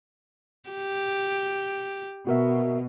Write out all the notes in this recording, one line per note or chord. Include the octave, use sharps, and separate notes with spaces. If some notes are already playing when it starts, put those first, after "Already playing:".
G4
B2 F#4 A#4 E5